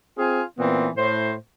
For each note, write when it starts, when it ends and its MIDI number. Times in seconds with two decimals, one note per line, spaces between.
0.17 0.42 60
0.17 0.42 65
0.17 0.42 68
0.17 0.42 80
0.58 0.88 46
0.58 0.88 52
0.58 0.88 59
0.58 0.88 60
0.96 1.33 45
0.96 1.33 72